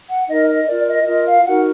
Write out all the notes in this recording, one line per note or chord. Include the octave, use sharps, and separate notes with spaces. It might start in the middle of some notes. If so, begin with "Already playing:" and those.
F#5
D#4 A#4 D#5
D#5
F4 A#4 D5
D#5
F4 A#4 D#5
F5
D#4 F#4 A#4 F#5